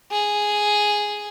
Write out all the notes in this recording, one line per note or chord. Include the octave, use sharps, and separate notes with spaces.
G#4